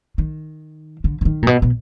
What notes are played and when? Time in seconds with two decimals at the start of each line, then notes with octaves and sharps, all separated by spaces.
0.18 D#3
1.04 D3
1.21 D3
1.25 D#3
1.43 A#2
1.47 B2
1.62 B2